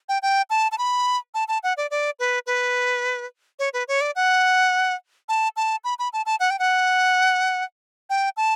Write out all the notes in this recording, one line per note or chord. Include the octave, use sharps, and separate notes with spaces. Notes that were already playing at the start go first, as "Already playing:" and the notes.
G5
G5
A5
A5
B5
A5
A5
F#5
D5
D5
B4
B4
C#5
B4
C#5
D5
F#5
A5
A5
B5
B5
A5
A5
F#5
G5
F#5
G5
A5